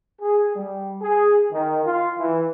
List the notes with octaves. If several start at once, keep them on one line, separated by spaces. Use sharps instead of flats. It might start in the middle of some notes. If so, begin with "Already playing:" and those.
G#4
G3
G#4
D#3
F4
E3